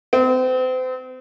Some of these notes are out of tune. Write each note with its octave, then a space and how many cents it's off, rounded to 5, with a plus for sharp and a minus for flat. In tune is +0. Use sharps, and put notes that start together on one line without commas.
C4 -35